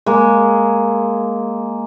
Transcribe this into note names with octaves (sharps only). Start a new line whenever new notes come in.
G#3 A#3